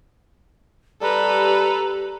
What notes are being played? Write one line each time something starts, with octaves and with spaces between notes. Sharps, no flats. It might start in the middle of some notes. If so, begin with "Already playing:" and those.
G3 G4 A4 B4 A#5